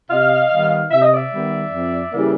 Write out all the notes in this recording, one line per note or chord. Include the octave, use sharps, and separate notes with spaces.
C3 D#5 F5
D#3 G3 B3
C3 E5
D#5
D5 E5
D#3 G3 B3
F2
C#3 E3 G3 A#3